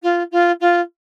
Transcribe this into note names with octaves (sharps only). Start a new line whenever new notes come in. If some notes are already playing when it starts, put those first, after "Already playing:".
F4
F4
F4